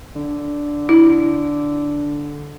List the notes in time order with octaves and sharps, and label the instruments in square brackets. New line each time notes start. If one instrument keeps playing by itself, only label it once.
[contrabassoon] D3
[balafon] E4